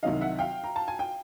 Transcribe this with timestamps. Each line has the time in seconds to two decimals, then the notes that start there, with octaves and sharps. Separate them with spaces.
0.03 C2 C3 D#3 F#3 D#5 F5
0.21 E5 F#5
0.39 F5 G5
0.64 A#5
0.76 A5
0.88 G#5
0.99 G5